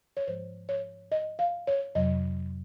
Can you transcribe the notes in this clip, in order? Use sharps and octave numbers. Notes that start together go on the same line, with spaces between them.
C#5
G#2 F3 G#3 C5
C#5
D#5
F5
C#5
F2 C3 F#3 D#5